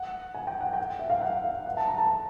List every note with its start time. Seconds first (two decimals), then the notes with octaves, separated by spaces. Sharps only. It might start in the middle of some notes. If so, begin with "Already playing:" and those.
Already playing: F#5
0.35 G#5
0.47 G5
0.61 F#5
0.73 G5
0.99 E5
1.10 F5
1.22 F#5
1.44 F5
1.66 F#5
1.77 A5
1.88 A#5
1.98 A5